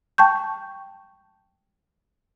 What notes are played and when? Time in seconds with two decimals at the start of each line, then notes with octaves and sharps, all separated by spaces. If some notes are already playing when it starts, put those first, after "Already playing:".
0.18 G5 A5 C#6 G6